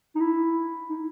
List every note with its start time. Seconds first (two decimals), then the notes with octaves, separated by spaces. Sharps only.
0.15 D#4
0.20 E4
0.89 D#4